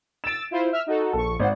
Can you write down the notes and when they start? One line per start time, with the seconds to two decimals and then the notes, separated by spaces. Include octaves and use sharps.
0.24 E6 A6 D7 E7
0.51 E4 F4 C5
0.72 E5 E6 F6
0.87 D#4 F#4 A4
1.13 A#1 A4 C#6
1.40 G#1 C5 F#5